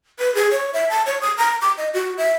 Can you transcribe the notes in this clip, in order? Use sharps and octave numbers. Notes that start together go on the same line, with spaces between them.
B4
G#4
C#5
E5
A5
C#5
D#6
A#5
D6
D#5
F#4
E5